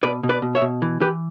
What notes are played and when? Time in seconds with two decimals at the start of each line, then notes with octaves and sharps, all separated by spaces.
0.03 B2 B4 D5
0.23 B2
0.29 B4 D5
0.42 B2
0.55 C#5 E5
0.61 B2
0.82 E3
1.01 E3 G4 B4